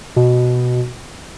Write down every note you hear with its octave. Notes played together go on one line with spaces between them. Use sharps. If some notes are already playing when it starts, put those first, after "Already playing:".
B2